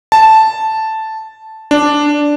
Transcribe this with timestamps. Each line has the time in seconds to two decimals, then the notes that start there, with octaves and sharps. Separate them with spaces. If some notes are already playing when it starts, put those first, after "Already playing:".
0.12 A5
1.71 D4